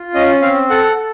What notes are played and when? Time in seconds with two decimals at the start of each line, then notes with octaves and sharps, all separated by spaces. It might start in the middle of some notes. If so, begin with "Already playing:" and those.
Already playing: F4
0.14 C#4 D#5
0.42 C4 F5
0.70 A4 F#5
0.97 A4